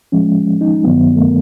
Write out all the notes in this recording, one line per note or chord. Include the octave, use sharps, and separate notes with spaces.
A2 F3 G#3 C#4
D#4
G2 D#3 F#3 B3
A3
A#3